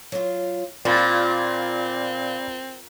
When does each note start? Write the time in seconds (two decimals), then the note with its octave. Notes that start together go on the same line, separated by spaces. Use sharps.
0.12 F#3 F4
0.85 A#2 C4 F4 D5 B5 A6